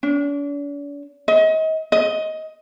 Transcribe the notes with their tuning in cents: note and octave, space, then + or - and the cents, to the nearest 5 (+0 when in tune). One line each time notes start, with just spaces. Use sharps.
D4 -45
D#5 +35
D#5 +15